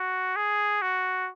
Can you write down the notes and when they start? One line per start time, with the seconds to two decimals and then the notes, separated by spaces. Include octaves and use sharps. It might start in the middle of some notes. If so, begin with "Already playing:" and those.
Already playing: F#4
0.36 G#4
0.82 F#4